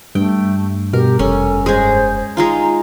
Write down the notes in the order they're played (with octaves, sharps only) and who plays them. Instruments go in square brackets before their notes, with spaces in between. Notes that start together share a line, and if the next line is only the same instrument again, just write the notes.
[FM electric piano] G2 [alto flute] A3 [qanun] G5
[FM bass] B2 [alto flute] G4 [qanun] A#4
[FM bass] F1 [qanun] C#4 [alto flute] A4
[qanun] G#3 G#4 [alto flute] C5
[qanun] G#3 D#4 F4 [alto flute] A#5